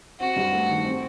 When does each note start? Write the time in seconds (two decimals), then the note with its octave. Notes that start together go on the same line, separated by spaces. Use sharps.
0.20 C4 F#4
0.36 G2
0.52 A3
0.69 D#3
0.85 C4